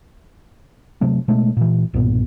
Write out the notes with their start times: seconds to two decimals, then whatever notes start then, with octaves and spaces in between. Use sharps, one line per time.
1.01 C3 F#3 A3
1.28 B2 G#3 A3
1.57 A#2 E3
1.94 B1 G2 A#2 B3